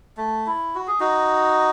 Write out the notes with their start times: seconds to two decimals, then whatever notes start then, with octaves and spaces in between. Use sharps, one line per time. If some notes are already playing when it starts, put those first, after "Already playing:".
0.17 A3
0.46 E4
0.75 F#4
0.87 G#4
1.00 D#4 F#4